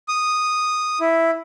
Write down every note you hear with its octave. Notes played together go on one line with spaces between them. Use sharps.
D#6
E4